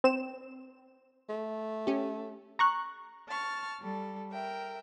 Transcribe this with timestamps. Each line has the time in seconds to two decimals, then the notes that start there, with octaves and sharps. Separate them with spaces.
0.04 C4 E7
1.29 A3
1.87 C#4 G4
2.59 A#5 C#6 F#6
3.28 A5 C#6 F6
3.80 G3 A4
4.31 A#4 E5 G5